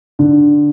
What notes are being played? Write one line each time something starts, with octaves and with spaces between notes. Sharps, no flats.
D3